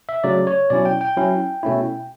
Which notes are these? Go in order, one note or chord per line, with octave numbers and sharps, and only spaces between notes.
E5
C#3 F#3 A3 D5
C#5
B2 F#3 C#4 E4 D5
G5
G5
F#3 C#4 E4
B2 A3 C#4 E4